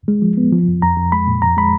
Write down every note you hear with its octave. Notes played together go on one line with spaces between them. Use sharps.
G#3
F3
B3
F3
F2
F2 A#5
F2
G#3 B5
A#2
F2 A#5
G#3 B5